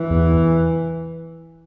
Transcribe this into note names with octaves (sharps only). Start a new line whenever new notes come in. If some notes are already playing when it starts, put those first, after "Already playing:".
Already playing: E3
E2